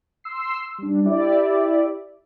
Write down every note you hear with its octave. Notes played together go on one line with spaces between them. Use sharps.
C6 E6 C7
G3 D4
E4 G4 D5 E5